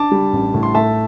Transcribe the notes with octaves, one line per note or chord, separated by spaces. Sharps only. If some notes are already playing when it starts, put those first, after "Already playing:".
Already playing: D4 A5 D6
G3
A1
A2
C6
A3 E5 A5